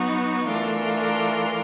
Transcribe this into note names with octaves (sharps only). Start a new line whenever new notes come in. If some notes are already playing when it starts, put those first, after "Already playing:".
Already playing: F#3 B3 D#4 F#4
E3 A3 D4 F4 A#4